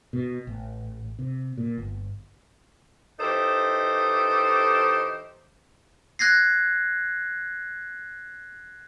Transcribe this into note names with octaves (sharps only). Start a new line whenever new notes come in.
B2
A1
C3
A#2
G1
E3 D#4 G4 A4 C5
F#6 G#6 A#6 C7